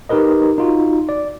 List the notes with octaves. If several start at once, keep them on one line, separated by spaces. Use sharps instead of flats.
D#4 G4 A#4 B4 D#5
D#4 F4 F#4
D5